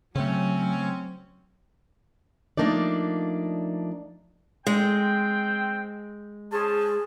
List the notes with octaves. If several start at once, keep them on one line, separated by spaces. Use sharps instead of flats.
C#3 F#3 A3 C4 C#4
F3 A3 A#3 D4 D#4 D5
G#3 C4 G5
C#4 G#4 C5 A5